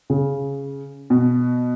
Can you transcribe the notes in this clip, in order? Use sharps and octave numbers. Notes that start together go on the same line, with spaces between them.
C#3
B2